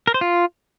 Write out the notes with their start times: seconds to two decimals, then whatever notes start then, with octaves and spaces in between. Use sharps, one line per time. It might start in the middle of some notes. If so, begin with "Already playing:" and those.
0.07 A#4
0.14 C5
0.21 F4